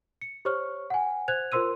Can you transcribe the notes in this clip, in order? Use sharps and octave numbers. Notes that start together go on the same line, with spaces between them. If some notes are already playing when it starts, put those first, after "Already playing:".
C#7
G4 C5 C#5 C#6 F6
F#5 G#5
C5 F#6 G#6 F7
F4 A#4 C5 C6 E6 D#7